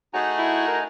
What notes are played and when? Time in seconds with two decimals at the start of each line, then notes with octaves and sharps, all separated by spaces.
0.13 A3 D#4 F#4 G#4 G#5 A#5
0.38 E4
0.68 A#4